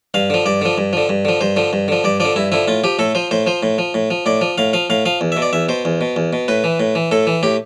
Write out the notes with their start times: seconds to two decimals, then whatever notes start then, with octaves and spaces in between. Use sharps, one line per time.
0.14 G2 F5
0.30 D3 F3
0.46 G2 D5
0.61 D3 F3
0.78 G2
0.93 D3 F3
1.09 G2
1.25 D3 F3
1.41 G2 C5
1.56 D3 F3
1.73 G2
1.88 D3 F3
2.04 G2 D5
2.20 D3 F3 D5
2.36 G2 E4
2.52 D3 F3 E4
2.68 A2 F4
2.84 F3 G4
2.99 A2 A4
3.15 F3 C5
3.31 A2 C5
3.47 F3 C5
3.63 A2
3.78 F3
3.94 A2
4.11 F3
4.26 A2 D5
4.41 F3
4.58 A2 F5
4.73 F3 F5
4.90 A2 F5
5.06 F3 F5
5.21 E2
5.32 E5
5.37 B2
5.42 D5
5.53 E2 E5
5.69 B2 C5
5.85 E2
6.01 B2
6.16 E2
6.33 B2
6.48 A2 B4
6.64 E3
6.80 A2
6.95 E3
7.11 A2 A4
7.27 E3
7.43 A2 G4